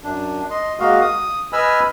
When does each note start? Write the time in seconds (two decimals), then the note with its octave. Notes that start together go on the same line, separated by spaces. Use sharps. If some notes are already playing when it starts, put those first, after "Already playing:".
0.04 F#2 D4
0.50 D#5 C6
0.80 G#3 A#3 F#4 D#5 F5
1.01 D#6
1.53 B4 D#5 G#5 B5 E6 F6